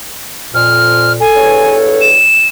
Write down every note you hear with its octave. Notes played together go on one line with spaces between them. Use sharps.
F2 A#2 F6
A4 G#5
E2 G2 C#5
E7